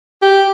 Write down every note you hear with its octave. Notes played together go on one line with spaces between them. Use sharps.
G4